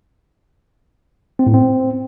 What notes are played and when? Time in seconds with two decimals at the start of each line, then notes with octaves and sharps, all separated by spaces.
1.39 C4
1.47 A2
1.54 C4